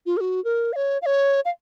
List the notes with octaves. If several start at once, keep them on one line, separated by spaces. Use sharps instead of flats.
F4
A#4
F#4
A#4
F5
C#5
F5
C#5
F5